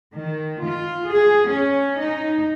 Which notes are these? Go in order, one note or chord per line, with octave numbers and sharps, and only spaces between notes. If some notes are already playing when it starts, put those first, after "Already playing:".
D#3
F4
G#4
C#4
D#4